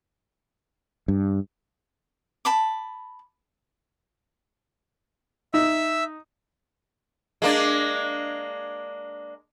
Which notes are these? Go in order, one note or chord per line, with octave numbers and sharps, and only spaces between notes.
G2
A5 B5 D6
D#4 E5 E6
G#3 A#3 D4